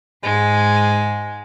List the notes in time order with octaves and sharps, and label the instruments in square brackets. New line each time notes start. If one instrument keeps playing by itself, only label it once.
[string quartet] G#2 G#3